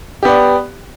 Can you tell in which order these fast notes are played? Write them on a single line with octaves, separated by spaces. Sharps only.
G4 B3 D5